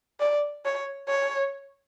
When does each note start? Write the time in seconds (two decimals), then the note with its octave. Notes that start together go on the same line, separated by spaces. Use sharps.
0.20 D5
0.65 C#5
1.08 C#5